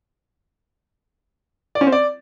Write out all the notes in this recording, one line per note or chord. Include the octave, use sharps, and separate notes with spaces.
D5
C#4
C4
D5